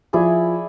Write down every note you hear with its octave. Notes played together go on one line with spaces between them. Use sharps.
F3 E4 G#4 D5